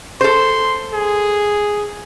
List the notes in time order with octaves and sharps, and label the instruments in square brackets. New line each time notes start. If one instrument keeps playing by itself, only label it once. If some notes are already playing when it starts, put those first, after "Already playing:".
[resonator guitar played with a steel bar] A4 C5 [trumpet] C6
[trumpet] G#4